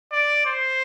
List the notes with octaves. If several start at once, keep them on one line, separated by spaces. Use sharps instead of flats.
D5
C5